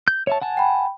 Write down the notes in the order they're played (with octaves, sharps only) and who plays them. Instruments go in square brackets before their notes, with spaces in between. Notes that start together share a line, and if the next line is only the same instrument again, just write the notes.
[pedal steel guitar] G6
C#5 E5 A5
F#5 G#5 A5
[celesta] G5 B5